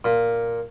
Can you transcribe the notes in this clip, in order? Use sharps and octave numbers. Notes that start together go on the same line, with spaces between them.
A#2